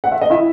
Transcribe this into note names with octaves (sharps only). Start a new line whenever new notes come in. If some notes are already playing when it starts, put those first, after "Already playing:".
F#5
E5
D#5
E4 E5